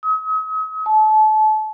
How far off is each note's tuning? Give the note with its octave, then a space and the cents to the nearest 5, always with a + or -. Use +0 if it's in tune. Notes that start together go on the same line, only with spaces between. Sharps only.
D#6 +45
A5 -30